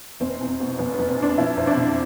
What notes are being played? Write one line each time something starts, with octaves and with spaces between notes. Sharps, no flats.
F1 C4
E2
B2
F1 B3
F1 B3
C4
E2 D4
F3 E4
F2 C4
D4
D3